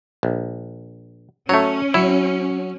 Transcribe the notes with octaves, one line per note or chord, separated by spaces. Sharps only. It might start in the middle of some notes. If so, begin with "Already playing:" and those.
A#1
F#3 A3 C#4 C#5
F#3 E4